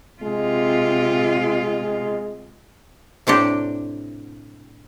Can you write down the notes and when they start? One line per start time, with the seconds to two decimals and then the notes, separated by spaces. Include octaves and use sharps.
0.22 C3 G#3 F4
3.27 A2 C3 D4 G4